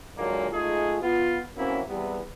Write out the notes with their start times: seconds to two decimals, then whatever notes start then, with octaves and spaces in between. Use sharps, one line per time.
0.17 A#2 D3 D#3 F#3 G#3 A#3
0.52 G#3 A3 D#4 F4 G#4
1.01 B3 F4
1.57 E3 F#3 A#3 C4 C#4 E4
1.88 E2 C3 E3 G3 B3